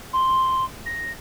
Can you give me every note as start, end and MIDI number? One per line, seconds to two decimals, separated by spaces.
0.13 0.64 84
0.86 1.11 94